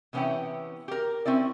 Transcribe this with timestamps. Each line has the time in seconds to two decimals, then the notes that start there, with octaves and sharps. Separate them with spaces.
0.13 C3 E3 B3 C#4 E4 G5
0.88 G4 A#4
1.26 C4 C#4 E4 D5